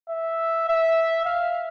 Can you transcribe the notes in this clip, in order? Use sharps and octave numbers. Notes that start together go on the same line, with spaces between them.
E5
E5
F5